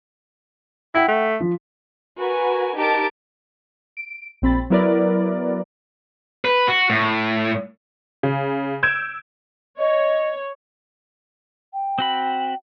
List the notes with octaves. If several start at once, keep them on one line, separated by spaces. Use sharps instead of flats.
E4 F#5 G5 B6
A3
F3
F#4 A#4 B4 G#5
D#4 G4 A#4 A5 A6 D7
D7
A#1 C4 B5 A6
F#3 B3 E4 A#4 B4 D5
B4
F#4
A2
C#3
E6 G6 G#6 D7 E7
C#5 D#5
G5
C4 F#4 B5